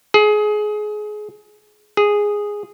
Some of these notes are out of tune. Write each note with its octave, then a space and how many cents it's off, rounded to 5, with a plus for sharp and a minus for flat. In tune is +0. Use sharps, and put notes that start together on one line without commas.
G#4 +25
G#4 -5